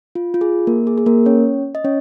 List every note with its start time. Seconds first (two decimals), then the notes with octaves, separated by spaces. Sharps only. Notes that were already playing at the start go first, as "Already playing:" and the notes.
0.15 F4
0.34 F4
0.41 G#4
0.67 A#3 A#4
0.87 G#4
0.98 G#4
1.06 A#3 A#4
1.26 C#4 C#5
1.75 D#5
1.85 C#4 C#5